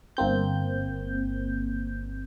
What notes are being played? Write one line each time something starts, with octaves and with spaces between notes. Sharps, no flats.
G1 A#3 C4 G6